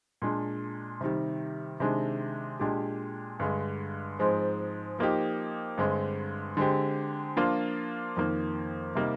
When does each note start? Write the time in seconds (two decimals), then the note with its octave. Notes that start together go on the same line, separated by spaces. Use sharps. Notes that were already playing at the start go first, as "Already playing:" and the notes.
0.22 A#2 G#3 D4
1.01 C3 D#3 G3
1.80 C3 D#3 G#3 D4
2.60 A#2 G#3 D4 G4
3.40 G2 D3 G#3
4.19 G#2 F3 G#3 C4
4.99 F3 A#3 D#4 G4
5.78 G2 D3 G#3 C4
6.57 D3 G#3 C4 G4
7.37 F3 A#3 D4 F4
8.17 F2 D#3 A#3
8.95 C3 G3 A#3 D#4